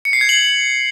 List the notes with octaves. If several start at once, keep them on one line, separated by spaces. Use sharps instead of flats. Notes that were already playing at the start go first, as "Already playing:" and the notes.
C#7
C7
G#6
F#7